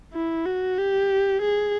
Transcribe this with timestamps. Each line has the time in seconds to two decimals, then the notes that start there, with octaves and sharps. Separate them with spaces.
0.13 E4
0.45 F#4
0.78 G4
1.42 G#4